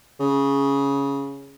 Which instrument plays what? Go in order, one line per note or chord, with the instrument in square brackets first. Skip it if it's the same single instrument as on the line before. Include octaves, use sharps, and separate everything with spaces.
[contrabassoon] C#3